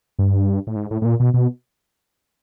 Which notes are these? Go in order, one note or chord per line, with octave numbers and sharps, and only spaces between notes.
G2
A2
G#2
A2
A2
A#2
B2
B2